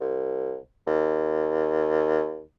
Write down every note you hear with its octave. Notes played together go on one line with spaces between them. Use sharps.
C2
D#2